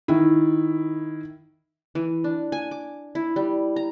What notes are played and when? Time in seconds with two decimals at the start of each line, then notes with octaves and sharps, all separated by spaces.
0.08 D#3 E4
1.95 E3
2.24 D4
2.52 G#5
2.71 D6
3.15 E4
3.36 G3
3.76 A#5